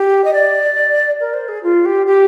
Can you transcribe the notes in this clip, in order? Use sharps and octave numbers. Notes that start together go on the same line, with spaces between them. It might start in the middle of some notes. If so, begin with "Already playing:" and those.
Already playing: G4
D#5
D5
A#4
C5
G#4
F4
G4
G4